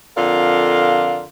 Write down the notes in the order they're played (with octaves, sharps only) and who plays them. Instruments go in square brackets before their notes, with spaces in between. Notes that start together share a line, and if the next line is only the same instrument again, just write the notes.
[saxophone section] F2 D3 F4 A#4 F5